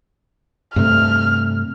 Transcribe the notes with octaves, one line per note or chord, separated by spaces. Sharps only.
G2 C3 A3 F6